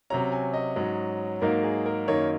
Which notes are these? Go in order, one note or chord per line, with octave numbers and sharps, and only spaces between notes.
C3 F#3 C#4 A#5
G#5
D#5
G#2 F#3 C#4
G#2 F#3 A#3 D#4 A#4
G#4
A#4
F#2 D#3 A#3 D#4 C#5